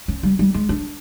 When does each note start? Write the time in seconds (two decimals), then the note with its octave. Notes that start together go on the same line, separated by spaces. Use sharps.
0.08 C#4
0.23 G3
0.39 G3
0.54 G#3
0.69 D4